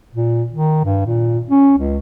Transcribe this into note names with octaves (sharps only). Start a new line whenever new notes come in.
A#2
D#3
G2
A#2
C#4
C#2